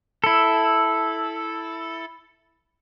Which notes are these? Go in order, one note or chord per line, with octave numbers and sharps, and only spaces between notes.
E4 A4